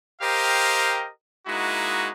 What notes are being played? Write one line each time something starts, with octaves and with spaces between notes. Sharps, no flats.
G4 A#4 C5 D#5 F5 G5
G#3 A#3 D#4 E4 F#4